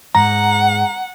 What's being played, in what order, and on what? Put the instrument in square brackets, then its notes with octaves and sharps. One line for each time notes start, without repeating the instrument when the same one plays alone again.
[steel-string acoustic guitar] G#2 [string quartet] F#5 [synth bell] A#5